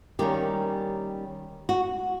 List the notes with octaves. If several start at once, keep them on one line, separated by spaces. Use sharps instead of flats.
D#3 G3 A#3 C#4 G4
F#4